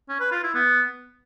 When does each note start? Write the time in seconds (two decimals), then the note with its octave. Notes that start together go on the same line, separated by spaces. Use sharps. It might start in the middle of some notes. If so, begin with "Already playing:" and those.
0.09 C#4
0.20 B4
0.32 F4
0.43 E4
0.55 B3